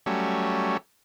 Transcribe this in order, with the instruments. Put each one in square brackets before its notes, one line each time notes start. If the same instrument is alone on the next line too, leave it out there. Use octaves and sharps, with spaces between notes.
[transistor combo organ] F#3 G3 A3 C#4